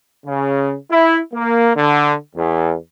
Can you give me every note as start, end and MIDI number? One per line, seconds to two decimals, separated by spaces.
0.25 0.74 49
0.91 1.19 64
1.33 1.71 58
1.76 2.14 50
2.34 2.74 40